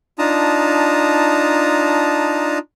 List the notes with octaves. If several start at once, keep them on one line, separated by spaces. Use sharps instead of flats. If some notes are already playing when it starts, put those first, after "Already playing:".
D4 D#4 F4 A5 A#5 D#6